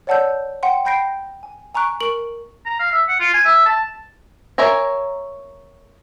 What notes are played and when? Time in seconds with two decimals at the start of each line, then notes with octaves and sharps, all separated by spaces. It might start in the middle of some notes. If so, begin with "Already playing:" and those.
0.07 C#5 D5 F#5 A5 E6 G6
0.63 F#5 G5 C6
0.85 G5 B5 G6 A#6 C7 D7
1.43 G#5
1.75 G#5 A#5 C#6 F#6 D7
2.01 A#4 C#6 D7 F#7
2.66 A#5
2.79 F5
2.92 E5
3.08 F#5
3.20 F4
3.34 G#5
3.45 E5
3.66 A5
4.58 A#4 C#5 E5 G#5 A#5